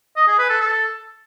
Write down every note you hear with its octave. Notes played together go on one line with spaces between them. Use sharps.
D#5
G#4
B4
A4
A4